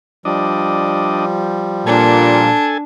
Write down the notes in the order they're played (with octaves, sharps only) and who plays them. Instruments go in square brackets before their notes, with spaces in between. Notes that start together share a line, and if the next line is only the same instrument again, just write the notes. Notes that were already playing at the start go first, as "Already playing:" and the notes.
[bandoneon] F3 G3 [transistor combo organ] D4 D#5
[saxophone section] A#2 [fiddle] D4 [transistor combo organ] A4 G#5